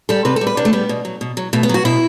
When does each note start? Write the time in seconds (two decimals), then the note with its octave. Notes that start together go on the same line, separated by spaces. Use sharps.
0.09 G3 A4
0.25 C3 B4
0.36 A4
0.41 G3
0.47 B4
0.57 C3 D4
0.65 A3
0.73 G3 B3
0.89 B2
1.05 F#3
1.21 B2
1.37 F#3
1.53 B2 A3
1.63 B3
1.69 F#3 F#4
1.85 B2 E4